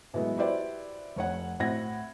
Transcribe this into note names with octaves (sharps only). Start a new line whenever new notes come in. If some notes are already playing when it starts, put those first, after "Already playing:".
A2 E3 F#3 G#3 A3 B3
E4 F#4 G4 B4 C5 D5
F1 C#5 F#5
A2 C4 F#4 F#5 G#6 A#6